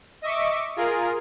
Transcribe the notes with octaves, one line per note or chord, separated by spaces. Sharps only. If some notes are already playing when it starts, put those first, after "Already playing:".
D#5 E5 C#6 D6
F4 G#4 A#4